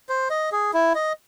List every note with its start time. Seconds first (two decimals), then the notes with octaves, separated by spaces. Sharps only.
0.09 C5
0.30 D#5
0.52 G#4
0.73 E4
0.95 D#5